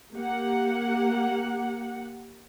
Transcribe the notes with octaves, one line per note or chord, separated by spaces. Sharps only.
A#3 G4 F#5